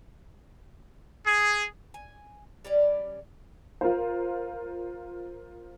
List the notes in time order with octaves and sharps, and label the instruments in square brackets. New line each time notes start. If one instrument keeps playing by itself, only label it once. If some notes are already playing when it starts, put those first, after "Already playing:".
[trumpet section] G#4
[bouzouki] G#5
G3 C#4 D5
[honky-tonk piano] F4 A#4 C5